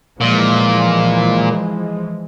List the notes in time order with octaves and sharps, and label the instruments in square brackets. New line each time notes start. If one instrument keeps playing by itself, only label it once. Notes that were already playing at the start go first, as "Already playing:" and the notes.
[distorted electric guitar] A#2 [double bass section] E3 F3 G#3